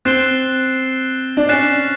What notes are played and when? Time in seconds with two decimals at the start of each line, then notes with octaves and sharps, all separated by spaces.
0.05 C4 F#6 A6 C7 E7 G7
1.37 D4
1.49 C#4 F#6 A6 C7 E7